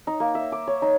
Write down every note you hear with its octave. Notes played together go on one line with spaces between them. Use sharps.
D#4
A#3
E5
D6
C#5
D#4